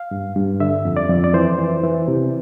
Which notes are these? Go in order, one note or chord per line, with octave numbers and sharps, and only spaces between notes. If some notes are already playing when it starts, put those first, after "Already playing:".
Already playing: F5
G2
G2
D3 E5
F2
D5
F2
D5
E3 C5
E3
E3
C3